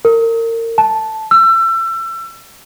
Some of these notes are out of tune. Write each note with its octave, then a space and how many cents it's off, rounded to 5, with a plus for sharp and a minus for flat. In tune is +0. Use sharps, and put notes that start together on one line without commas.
A#4 -30
A5 -5
E6 +30